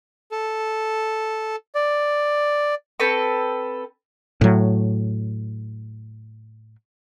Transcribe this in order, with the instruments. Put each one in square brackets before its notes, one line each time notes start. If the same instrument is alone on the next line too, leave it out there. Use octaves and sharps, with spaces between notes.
[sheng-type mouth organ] A4
D5
[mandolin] C4 A4 B4 C#6
[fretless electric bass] A2 F#3